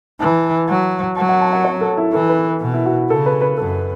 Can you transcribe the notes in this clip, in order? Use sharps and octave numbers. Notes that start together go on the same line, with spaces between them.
E3 A5
F#3
F#3 A5
F#5
A5
F#5
C#5
A4
E4
E3 A4
B4
B2
E4
F#4
C#3 A4
B4
B4
F#2 A4